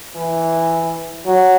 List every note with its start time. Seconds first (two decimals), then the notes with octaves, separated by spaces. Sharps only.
0.15 E3
1.27 F#3